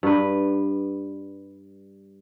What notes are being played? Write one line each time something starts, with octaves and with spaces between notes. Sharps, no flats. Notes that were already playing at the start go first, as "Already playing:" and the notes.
G2 B4